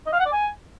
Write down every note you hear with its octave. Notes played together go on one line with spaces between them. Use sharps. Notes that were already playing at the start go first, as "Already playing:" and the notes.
D#5
F5
F#5
D5
G#5